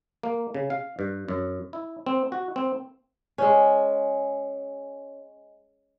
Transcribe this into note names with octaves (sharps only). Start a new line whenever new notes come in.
A#3
C#3
F5
G2
F#2
E4
C4
F#4
C4
G#3 C#4